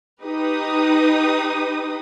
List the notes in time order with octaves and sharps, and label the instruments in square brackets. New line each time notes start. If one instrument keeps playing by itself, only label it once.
[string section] D#4 G4 B4 D#6